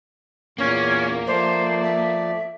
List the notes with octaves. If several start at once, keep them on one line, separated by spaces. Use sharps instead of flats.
E2 A#2 A#3 C#4
F3 A3 C5 D5
E5